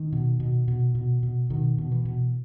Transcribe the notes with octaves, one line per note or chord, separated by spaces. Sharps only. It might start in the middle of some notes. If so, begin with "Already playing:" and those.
Already playing: D#3
B2
B2
B2
B2
B2
B2 D#3
B2
E3
B2